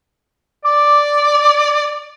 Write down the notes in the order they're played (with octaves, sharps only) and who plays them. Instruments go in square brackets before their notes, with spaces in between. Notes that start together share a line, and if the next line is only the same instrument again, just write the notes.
[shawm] D5 [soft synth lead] D6